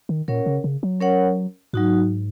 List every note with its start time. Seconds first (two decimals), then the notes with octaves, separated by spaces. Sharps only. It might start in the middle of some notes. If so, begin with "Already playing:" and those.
0.09 D#3
0.28 A#2 C#4 A#4 C#5 F#5
0.46 C#3
0.64 C#3
0.83 F#3
1.00 C#4 A#4 C#5 F#5
1.73 G#2 F#3 D#4 F#4